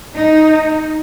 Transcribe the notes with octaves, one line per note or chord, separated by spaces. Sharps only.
D#4